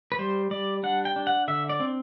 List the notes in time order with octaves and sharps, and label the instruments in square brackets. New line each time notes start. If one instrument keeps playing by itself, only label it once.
[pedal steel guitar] B4
G3 C5
G3 D5
D4 F#5
G5
D4
F#5
D3 E5
D5
C4